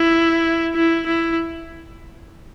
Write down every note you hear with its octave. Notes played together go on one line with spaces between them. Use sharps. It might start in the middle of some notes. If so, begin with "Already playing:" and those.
Already playing: E4
E4
E4